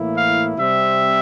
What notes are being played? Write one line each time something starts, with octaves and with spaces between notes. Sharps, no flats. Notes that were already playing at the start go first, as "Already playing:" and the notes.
Already playing: A2 E3 A#3 E4
F5
C3 G3 C4 E5